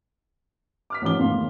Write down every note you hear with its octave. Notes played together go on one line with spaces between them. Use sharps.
D6 F6 B6
A1 A#2 D#3 F3 D6 G7
E1 A2 D#3 F5 C6